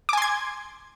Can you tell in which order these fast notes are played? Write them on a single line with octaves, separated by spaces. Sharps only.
D6 G#5 C6 G#6